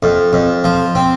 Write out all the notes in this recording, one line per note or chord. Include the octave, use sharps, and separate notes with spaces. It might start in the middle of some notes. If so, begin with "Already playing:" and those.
F2
F2
F3
C4